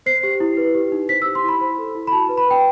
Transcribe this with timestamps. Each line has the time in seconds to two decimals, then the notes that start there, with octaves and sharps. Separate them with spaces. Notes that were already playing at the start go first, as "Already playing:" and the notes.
0.06 C5 C7
0.23 G4
0.40 E4
0.57 B4
0.75 G4
0.92 D#4
1.09 C5 B6
1.22 E6
1.26 G4
1.35 C6
1.44 E4 B5
1.61 C5
1.78 A4
1.95 E4
2.07 B5
2.12 F#4 A5
2.29 B4
2.38 B5
2.47 B4 G5